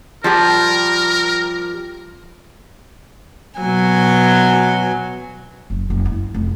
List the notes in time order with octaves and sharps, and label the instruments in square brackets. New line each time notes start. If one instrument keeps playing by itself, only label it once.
[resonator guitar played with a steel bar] F3 G3 G4 [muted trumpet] A#4
[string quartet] B2 F#3 G#5
[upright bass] F#1
F#1
E4
F1